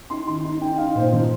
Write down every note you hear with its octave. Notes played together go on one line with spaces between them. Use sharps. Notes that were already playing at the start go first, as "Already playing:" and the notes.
D#4 C6
D#3 C6
D#4
D#4 G5
D#4 F5
A#2 C5
F3 C5